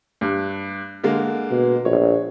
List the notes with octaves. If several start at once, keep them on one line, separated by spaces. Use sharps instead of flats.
G2
D3 G#3 A#3
B2
A#1 C#5